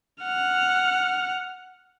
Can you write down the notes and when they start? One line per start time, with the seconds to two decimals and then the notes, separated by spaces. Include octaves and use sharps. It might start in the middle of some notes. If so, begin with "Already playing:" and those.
0.22 F#5 F6